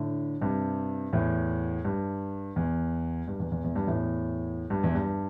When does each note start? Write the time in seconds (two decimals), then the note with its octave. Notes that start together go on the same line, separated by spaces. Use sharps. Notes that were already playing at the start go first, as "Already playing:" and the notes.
Already playing: A2 D3
0.41 G2 C3
1.13 E2 A2
1.85 G2
2.56 E2
3.28 G2
3.40 E2
3.52 E2
3.64 E2
3.76 G2
3.87 E2 A2
4.70 G2
4.83 E2
4.95 G2